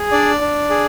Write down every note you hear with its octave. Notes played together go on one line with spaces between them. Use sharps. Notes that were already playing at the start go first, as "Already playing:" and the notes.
Already playing: G#4
D4 D5
D4
G#4